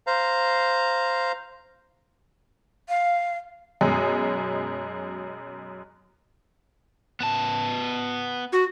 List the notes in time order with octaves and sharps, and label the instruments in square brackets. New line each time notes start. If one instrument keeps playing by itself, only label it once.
[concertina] C5 F5 A#5
[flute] F5
[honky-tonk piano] F#2 B2 G#3
[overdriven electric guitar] B3 A5
[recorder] F#4